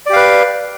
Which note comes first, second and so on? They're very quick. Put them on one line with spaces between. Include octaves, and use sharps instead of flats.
D5 G4 F5 B4